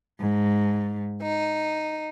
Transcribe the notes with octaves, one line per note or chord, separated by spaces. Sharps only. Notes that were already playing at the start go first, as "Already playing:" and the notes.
G#2
D#4